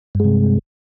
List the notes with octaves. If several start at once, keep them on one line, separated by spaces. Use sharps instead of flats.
G2 C3 G#3